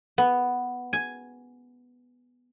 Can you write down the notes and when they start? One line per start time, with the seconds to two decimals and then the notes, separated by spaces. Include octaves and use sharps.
0.18 B3
0.93 G#5